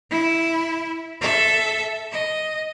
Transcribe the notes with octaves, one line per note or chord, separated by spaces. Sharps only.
E4
A4 E5
D#5